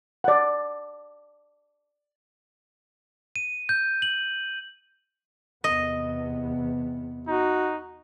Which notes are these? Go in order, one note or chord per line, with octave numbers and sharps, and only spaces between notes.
D5 F#5
D#7
G6
F#7
E2 C3 B3 D#5
D#4 F#4